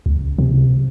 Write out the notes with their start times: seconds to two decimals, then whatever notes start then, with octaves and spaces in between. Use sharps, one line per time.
0.06 C#2
0.38 C3